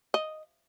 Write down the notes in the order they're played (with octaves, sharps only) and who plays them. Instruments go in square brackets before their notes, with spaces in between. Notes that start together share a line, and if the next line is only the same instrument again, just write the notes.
[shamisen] D#5